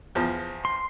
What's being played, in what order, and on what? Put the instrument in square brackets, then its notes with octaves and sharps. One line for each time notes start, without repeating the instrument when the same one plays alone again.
[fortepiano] E2 F3
[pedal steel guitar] C6